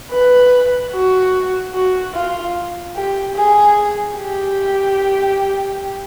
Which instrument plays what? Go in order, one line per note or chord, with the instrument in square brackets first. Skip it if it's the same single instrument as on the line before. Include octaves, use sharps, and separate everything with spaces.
[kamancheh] B4
F#4
F#4
F4
G4
G#4
G4